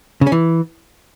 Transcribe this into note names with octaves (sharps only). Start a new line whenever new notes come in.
C#3
C#4
E3